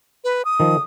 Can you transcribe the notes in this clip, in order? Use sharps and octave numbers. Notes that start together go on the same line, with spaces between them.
B4
D#6
D#3 F3